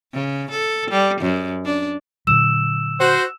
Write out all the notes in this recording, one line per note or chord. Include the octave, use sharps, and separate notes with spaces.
C#3
A4
G3
F#2
D4
A#2 D3 F#3 E6 E7
F#4 C5